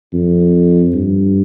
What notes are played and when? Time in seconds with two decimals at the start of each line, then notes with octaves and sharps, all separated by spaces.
0.14 F2
0.94 G2